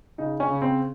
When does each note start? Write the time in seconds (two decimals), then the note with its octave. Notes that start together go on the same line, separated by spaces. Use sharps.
0.18 C#3 D#4
0.40 C#4
0.48 C#3
0.62 C4